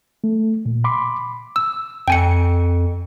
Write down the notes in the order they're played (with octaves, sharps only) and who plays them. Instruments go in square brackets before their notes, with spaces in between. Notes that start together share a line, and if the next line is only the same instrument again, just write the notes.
[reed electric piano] A3
A#2
B5 C6 D6
[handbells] E6
[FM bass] F2 [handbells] G5 G#5 C#7